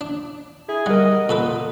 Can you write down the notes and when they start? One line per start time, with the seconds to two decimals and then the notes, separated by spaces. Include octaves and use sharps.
0.01 D4
0.69 E4 G#4
0.86 G3 A#4 D#5 F#5
1.29 A#2 A4 B4